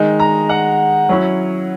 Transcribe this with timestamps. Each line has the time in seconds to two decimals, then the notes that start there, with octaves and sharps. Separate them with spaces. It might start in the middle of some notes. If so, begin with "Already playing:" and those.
Already playing: D#3 G#3 D#4
0.20 A#5
0.49 F#5
1.09 F#3 C#4 E4